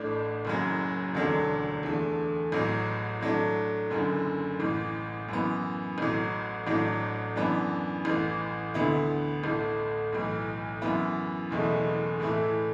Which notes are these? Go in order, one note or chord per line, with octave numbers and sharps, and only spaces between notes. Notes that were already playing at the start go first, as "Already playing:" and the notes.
Already playing: A1 A2 A3 D4
F#1 F#2 F#3
E1 D2 D3 F#3 D4
E2 D3 A3
A1 A2 F#3
A2 F#3 A3 D4
F#1 F#2 D3
A1 A2 E3
F#2 E3 B3
A1 A2 F#3
A1 A2 F#3 D4
F#2 E3 B3 D4
A1 A2 E3
D2 D3 B3 E4
A1 A2 A3
B1 A2 E3
F#2 E3 B3 E4
F#1 E2 B2 A3 E4
A2 E3 A3 E4